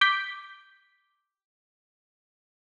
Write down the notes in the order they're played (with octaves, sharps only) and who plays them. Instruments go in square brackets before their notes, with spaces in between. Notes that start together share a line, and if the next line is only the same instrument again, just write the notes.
[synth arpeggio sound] D6 G6 B6